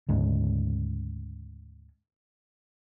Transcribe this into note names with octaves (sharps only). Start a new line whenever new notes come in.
D2 G#2 C#3